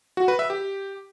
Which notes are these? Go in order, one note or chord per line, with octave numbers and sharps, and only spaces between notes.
F#4
B4
E5
G4